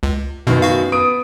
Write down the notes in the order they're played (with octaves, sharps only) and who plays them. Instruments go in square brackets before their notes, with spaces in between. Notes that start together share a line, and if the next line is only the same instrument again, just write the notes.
[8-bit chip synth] C#2
[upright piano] F#2 D#3 B3 [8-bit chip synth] B2
[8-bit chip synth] F#4 F5
[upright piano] B3 D#6 D7